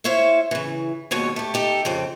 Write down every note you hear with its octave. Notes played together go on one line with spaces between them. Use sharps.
E4 C5 C#5 E5 F5
C#3 E3
D#2 G#2 B2 C#5
A3 G4
D#4 G4 A4
F2 C#3 C4